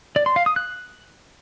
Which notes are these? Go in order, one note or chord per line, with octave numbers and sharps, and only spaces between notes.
D5
C6
F5
D#6
F#6